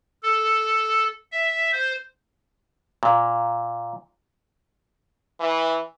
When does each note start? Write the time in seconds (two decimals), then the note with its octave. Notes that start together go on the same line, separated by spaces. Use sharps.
0.23 A4
1.32 E5
1.72 C5
3.03 A#2
5.40 E3